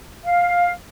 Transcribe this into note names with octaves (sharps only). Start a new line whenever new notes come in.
F5